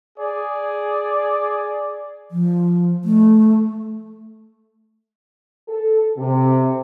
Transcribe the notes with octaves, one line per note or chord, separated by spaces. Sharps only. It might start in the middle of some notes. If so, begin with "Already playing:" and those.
G#4 D5
F3
A3
A4
C3